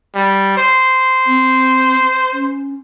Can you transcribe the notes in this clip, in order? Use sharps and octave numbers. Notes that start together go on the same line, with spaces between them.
G3
C5
C4
C#4